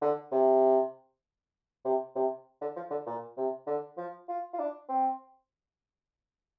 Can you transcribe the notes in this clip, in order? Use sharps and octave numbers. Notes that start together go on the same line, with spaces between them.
D3
C3
C3
C3
D3
F3
D3
A#2
C3
D3
F3
F4
F4
D4
C4